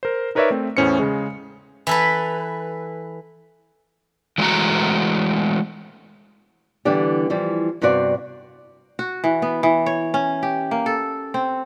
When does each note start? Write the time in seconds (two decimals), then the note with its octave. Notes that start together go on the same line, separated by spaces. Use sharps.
0.03 A#4 C5
0.35 D#4 A#4 B4 C#5 D5 E5
0.50 A3 C4
0.77 E2 A2 C#4 C5 C#7
0.99 C#3 G#3
1.87 E3 A4 B4
4.38 E3 G#3 A3 F#4 A#5
6.85 D3 E3 G3 B3 D4 G4
7.30 E3 F3 G3
7.81 G2 C3 B3 F#4 D5 F5
8.99 F#4
9.24 E3
9.42 B3
9.63 E3
9.86 C#5
10.14 C#4
10.43 G4
10.71 A#3
10.86 A4
11.34 C4